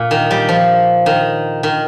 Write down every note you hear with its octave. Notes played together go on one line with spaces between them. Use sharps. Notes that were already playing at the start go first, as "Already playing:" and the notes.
Already playing: A#2
D#3
G3
F3
D#3
D#3